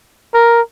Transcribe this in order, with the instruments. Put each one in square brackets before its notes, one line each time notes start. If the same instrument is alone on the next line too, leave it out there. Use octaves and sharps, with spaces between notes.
[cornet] A#4